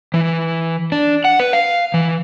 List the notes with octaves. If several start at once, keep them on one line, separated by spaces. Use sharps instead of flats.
E3
D4
F#5
B4
F5
E3